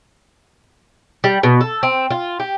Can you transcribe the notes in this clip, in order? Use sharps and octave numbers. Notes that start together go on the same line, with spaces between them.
G3
B2
A4
C4
F4
G4